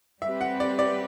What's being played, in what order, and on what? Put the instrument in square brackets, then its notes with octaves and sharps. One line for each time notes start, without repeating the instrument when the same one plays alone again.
[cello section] G3 C4 G4 B4 [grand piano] E5
[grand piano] F#5
D5
D5